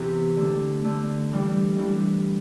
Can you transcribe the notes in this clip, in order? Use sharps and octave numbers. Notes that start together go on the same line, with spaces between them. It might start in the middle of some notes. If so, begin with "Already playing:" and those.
Already playing: C3 E3 B3 E4 G4
D3 A3 D4
D3 A3 D4
E3 G3 D4
E3 G3 D4